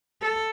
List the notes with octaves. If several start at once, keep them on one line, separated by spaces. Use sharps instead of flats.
A4